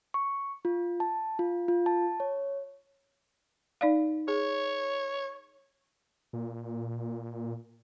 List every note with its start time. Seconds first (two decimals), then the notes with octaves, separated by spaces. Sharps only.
0.14 C#6
0.65 F4
1.00 A5
1.39 F4
1.68 F4
1.86 A5
2.20 C#5
3.81 D#4 D5 F5
4.28 G#4 C#5
6.33 A#2